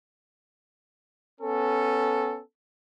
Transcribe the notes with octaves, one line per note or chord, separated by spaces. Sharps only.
B3 C#4 A4